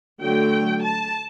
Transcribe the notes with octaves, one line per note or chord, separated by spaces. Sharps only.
D3 F#3 A3 G5
A5